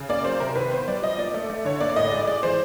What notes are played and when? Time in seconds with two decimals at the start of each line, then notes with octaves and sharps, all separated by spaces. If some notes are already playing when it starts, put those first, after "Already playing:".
Already playing: C#3
0.09 A#3 D5
0.25 F#3 C5
0.40 C3 A#4
0.55 D#3 B4
0.72 B3 C5
0.88 G3 D5
1.02 F3 D#5
1.18 A#3 D5
1.34 A3
1.50 A3
1.65 D3 C#5
1.81 A#3 D5
1.96 A2 D#5
2.12 G#3 D5
2.27 G#3 D5
2.43 E3 C5